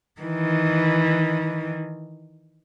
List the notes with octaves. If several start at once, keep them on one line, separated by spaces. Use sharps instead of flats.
D#3 E3